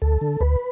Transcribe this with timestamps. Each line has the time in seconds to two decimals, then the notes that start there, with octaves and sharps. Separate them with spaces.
0.02 D2 A4
0.21 D3
0.40 D2 B4